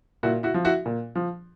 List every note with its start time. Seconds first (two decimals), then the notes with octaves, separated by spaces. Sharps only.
0.23 A#2 E4 F#4
0.43 E4 F#4
0.54 F3
0.65 E4 F#4
0.86 A#2
1.15 F3